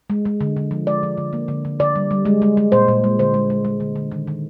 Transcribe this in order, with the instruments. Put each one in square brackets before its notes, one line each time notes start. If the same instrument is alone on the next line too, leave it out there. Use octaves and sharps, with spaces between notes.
[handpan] G#3
G#3
D3
D3
F3
G#3 D5
F3
D3
A#3
D3
D3
D3 D5
G3
G3
G#3
G#3
G#3
A#2 C5
A#2
G#3
D3 C5
G#3
G#3
G#3
D3
D3
D#3
D#3